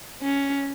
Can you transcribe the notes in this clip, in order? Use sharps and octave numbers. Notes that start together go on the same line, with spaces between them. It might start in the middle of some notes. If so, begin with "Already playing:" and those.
C#4